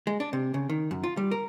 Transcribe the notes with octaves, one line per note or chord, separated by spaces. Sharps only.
G#3
D4
C3
C#3
D#3
F#2
F4
G3
A#4